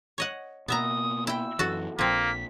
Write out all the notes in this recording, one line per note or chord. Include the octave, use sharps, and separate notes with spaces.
C#5 D#5 F#5
B2 A#3 B3 E5 A#5 D#6
E4 G5 E6
F#2 E3 F#4 A4
A#1 F3 A#3 C4 B6